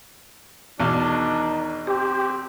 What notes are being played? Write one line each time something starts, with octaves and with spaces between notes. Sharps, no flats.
E2 B2 D#3 D4 D#4
C4 G4